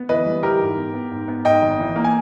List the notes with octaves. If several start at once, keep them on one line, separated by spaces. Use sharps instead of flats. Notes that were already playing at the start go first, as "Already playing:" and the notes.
Already playing: B3
E3 B4 D#5
G3
E3 G4 A#4
G#2
B3
B3
G#2
B3
G#2 D#5 G5
G#1
E3
A#3
G#5